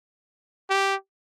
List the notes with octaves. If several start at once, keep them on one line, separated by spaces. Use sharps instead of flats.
G4